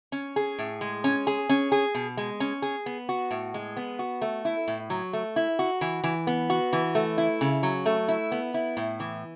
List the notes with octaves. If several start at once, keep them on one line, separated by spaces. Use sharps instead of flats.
C#4
G#4
A2
G#3
C#4
G#4
C#4
G#4
B2
G#3
C#4
G#4
B3
F#4
A2
G#3
B3
F#4
A3
E4
A2
F#3
A3
E4
F#4
E3
E3
B3
F#4
E3
A3
E4
C#3
F#3
A3
E4
B3
E4
A2
E3